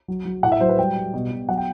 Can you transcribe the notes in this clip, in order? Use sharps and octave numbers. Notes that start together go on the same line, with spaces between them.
F#3
F#3
A2 F#5
E5
F#3 C5
B4
G3 G5
G3
B2
B2
F#3 F#5
G5